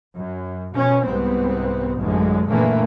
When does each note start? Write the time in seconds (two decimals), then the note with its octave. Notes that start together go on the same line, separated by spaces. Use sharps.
0.17 F#2
0.75 B2 F3 C#4
1.06 C2 G#2 B3 C4
1.99 A1 F#2 D3 G#3
2.50 F#1 A#2 D3 E3 A3 A#3